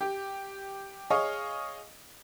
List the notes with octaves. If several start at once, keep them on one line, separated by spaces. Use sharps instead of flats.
G4
G#4 C#5 D#5 F5 C#6